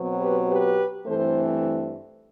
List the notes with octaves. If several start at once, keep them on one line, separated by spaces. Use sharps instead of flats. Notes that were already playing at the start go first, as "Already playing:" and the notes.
Already playing: B2 F#3 C4
G4 B4
G4 B4
G2 E3 A3 C4 A4 C5